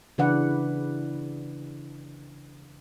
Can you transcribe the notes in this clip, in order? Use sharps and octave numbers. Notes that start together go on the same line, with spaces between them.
C#3 E3 D4 B4 D5 F#5